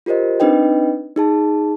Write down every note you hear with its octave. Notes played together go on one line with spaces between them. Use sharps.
F4 G4 A#4 C5 D#5
C4 D4 D#4 B4 D#5 G5
D#4 G#4 A5